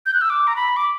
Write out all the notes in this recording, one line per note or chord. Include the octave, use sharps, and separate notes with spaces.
G6
F#6
E6
D6
A#5
B5
D6